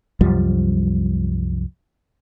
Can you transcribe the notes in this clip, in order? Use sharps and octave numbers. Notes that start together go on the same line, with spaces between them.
C2 F#2 F3 G3